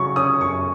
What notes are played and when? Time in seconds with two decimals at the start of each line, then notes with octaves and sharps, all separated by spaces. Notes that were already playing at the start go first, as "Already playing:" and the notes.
Already playing: C#3 F#3 C#6
0.16 C#4 D#6
0.41 F#2 C#6